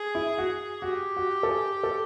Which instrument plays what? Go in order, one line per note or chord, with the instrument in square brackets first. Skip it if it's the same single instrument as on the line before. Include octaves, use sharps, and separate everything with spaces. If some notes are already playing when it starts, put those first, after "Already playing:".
Already playing: [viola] G#4
[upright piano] E4
F#4
[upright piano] F#4 [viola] G4
[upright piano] F#4
A4
G#4
A4